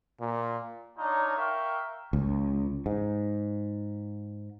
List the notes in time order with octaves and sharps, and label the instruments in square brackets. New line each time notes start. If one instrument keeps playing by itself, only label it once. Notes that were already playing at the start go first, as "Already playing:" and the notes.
[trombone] A#2
[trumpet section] D4 D#4 F4 C#5 A#5
A#4 E5 F5 G5 C#6
[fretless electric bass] C#2
G#2